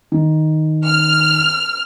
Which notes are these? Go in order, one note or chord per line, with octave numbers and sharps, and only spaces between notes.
D#3
F6